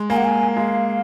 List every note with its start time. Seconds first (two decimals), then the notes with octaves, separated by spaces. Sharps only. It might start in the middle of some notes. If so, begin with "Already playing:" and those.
Already playing: G#3
0.10 A#3 G#5
0.17 F#5
0.25 G#5
0.57 G#3 F5